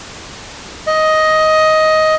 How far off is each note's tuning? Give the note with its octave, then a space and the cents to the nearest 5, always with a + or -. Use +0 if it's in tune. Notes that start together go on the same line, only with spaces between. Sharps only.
D#5 +10